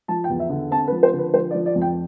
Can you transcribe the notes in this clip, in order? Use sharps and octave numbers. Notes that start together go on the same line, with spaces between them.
F3 A5
G5
E2
E5
D3
C4 A5
B4
F3
C5
D3
B4
F3 C5
D5
F3
D5
F2
G5